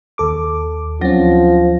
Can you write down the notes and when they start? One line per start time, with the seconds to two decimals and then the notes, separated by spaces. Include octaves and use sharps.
0.18 D#2 A4 D6
1.01 D2 F3 F#3 C4 C#4 A#6